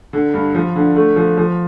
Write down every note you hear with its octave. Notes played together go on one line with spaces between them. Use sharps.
D3
G2
F3
D3
A3
F3
F3